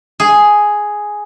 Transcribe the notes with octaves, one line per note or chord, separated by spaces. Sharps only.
G#4